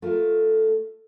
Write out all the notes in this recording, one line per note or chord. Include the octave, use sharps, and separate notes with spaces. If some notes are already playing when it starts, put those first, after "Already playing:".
A3 F4 A4 A#4